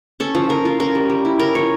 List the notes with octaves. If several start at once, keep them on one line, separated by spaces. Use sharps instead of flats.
C#4 A4
F3
F3 A#4
F4
C#4 A#4
G3
G3
E4
C#4 A#4
F3 C#5